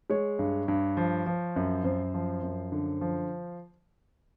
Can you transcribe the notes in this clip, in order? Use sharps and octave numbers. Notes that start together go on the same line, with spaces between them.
G#3 C#5
G2
G2
F3
F3
F#2
F#2 C5
F3
F#2
D3
F3